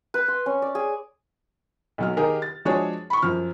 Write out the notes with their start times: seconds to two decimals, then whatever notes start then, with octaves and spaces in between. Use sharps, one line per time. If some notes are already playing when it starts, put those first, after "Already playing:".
0.14 B4
0.28 C6
0.46 C#4
0.62 D5
0.75 G#4
1.98 B1 F#3 F6
2.17 D#3 G4 G#4 A#4
2.42 A6
2.65 F3 G#3 D4 F#4 G#4 C#5
3.10 B5 C#6
3.22 F#2 F3 F6